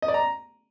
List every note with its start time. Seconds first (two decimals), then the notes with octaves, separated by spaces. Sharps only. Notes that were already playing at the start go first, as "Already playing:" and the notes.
0.02 D#5
0.08 D5
0.14 A#5